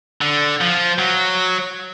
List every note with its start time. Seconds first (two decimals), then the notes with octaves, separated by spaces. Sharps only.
0.21 D3
0.61 F3
0.99 F#3